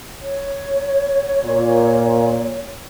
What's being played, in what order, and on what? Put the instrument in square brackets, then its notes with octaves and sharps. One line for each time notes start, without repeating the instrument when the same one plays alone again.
[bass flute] C#5
[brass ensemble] A#2